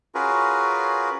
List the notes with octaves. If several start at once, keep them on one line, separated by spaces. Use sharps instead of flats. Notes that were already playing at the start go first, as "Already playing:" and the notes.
C#4 F4 F#4 G#4 A#4 B4